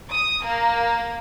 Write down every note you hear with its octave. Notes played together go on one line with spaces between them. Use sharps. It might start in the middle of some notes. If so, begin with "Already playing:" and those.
D#6
A#3